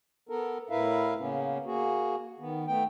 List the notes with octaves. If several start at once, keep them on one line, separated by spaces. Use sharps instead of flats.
B3 A4 A#4
A2 E4 A#4 B4 E5 F5
C#3 A#3 B3 C#4
A#3 F#4 G#4
D#3 B3
A3 B3 G5